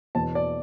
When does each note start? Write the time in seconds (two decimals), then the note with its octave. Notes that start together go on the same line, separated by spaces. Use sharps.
0.15 E1 E2 B2 A5
0.35 D5